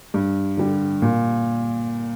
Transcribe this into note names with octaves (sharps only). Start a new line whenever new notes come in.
G2
D3 G3
A#2